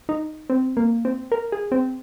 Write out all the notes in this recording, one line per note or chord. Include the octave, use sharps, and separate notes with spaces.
D#4
C4
A#3
C4
A#4
G#4
C4